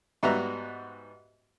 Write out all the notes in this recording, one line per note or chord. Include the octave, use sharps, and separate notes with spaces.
G#2 G3 B3 F#4 E5 A#5